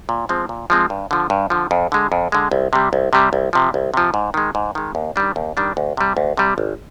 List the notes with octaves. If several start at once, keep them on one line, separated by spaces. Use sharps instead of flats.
A#2
F3 G#3 C4
A#2
F3 G#3 C4
G2
D3 F3
G2
D3 F3
F2
D3 G#3
F2
D3 G#3
C2
C3 G3
C2
C3 G3
C2
C3 F3
C2
C3 F3
G#2
D#3 G#3
G#2
D#3 G#3
D#2
D#3 G3 D4
D#2
D#3 G3 D4
D2
C3 G3
D2
C3 G3
G#1